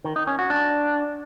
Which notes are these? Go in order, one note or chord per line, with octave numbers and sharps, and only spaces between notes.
D#3
D#4
C#4
F#4
D4